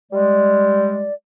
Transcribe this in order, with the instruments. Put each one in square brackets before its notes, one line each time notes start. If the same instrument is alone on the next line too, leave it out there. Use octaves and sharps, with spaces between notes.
[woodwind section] G3 G#3 [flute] D5